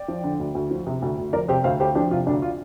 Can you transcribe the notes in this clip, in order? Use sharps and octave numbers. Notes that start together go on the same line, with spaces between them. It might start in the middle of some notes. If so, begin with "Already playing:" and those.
Already playing: D5 G5
F3
D3
D2
D2
F3
C3
D2
D2
F3 A#4 D5
C3 G4 C5
D2 C5 F5
D2 G4 C5
F3 D4 G4
C3 F4
D2 D4
F4